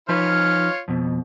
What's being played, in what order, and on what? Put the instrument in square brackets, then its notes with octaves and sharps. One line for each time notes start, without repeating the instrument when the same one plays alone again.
[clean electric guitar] F3 D#4 B4 [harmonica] F4 C#5 F6
[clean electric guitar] F2 B2